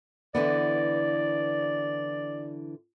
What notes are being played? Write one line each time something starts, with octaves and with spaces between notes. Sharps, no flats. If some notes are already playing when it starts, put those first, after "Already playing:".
D3 E3 B3 D5